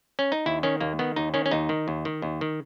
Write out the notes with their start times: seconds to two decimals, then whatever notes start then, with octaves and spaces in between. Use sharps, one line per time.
0.19 C#4
0.32 D#4
0.46 D#2 E4
0.63 D#3 C#4
0.81 D#2 A#3
0.99 D#3 B3
1.16 D#2 D#4
1.34 D#3 C#4
1.46 C#4
1.51 D#2 D#4
1.69 D#3
1.88 D#2
2.05 D#3
2.22 D#2
2.41 D#3